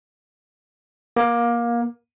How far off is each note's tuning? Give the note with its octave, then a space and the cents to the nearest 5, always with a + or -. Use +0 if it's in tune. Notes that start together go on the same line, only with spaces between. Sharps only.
A#3 +20